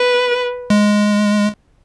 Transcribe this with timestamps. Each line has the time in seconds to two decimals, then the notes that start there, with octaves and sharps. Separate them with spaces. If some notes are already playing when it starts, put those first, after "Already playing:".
Already playing: B4
0.70 G#3